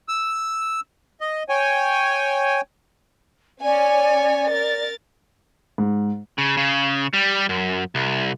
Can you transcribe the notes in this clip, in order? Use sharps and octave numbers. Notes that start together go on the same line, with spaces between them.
E6
D#5
C#5 G5 G#5
C#4 C#5 D5 G#5
A#4 A6
G#2
C#3
C#3
G3
F#2
C2